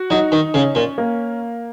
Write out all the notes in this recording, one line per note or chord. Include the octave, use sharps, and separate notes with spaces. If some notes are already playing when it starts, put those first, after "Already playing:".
Already playing: F#4
F#3 D#4
D#3
C#3 C#4
A#2
A#3